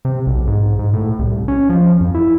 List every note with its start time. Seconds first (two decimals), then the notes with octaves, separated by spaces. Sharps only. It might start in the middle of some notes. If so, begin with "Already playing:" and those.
0.05 C3
0.27 B1
0.47 G#2
0.79 G#2
0.94 A2
1.19 C2
1.48 C#4
1.69 F3
2.01 F2
2.15 E4